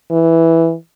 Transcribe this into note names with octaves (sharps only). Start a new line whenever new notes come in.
E3